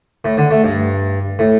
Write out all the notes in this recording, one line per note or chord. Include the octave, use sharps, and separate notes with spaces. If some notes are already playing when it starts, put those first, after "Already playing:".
A2
D3
A3
G2
A2